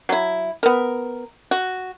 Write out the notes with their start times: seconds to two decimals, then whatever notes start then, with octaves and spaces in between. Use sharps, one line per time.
0.09 F#3 E4
0.63 B3 A#4
1.51 F#4